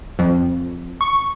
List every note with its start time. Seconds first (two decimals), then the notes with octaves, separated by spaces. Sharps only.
0.19 F2
1.01 C#6